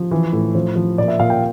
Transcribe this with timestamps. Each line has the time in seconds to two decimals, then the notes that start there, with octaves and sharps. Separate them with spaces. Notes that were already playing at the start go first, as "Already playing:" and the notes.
Already playing: F3
0.11 E3
0.33 A2
0.55 F3 C5
0.76 F3
0.98 A#2 D5
1.08 E5
1.20 A#2 F5
1.30 G5